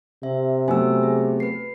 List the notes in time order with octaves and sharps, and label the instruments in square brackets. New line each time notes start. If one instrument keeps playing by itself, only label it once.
[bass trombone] C3 [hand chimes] E5
[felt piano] F#3 A3 B3 [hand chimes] G#5 E6
[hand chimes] G#4
B4 C7